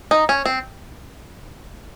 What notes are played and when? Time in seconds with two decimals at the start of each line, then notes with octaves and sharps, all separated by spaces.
0.11 D#4
0.29 C#4
0.46 C4